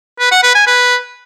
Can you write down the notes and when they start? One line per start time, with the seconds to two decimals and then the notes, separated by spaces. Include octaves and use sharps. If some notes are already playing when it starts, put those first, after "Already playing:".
0.19 B4
0.31 F#5
0.43 B4
0.55 G#5
0.67 B4